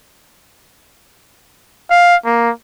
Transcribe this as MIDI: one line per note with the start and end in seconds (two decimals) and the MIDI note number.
1.91 2.15 77
2.25 2.50 58